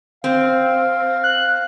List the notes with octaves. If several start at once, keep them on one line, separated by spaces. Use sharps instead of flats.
C4 F5
F#6